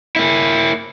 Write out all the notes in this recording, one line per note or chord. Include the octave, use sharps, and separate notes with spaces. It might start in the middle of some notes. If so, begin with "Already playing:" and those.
A#3 E4